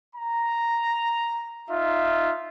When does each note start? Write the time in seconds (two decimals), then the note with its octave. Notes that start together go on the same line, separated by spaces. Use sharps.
0.16 A#5
1.70 D#4 F4 E5